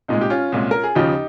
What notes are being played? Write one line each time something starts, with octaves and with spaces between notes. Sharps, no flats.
C2 A#2 G#3 D#4
G4
C#4 F4
C2 A#2 G#3
A#4
G#4
D#2 C#3 F3 D#4 G4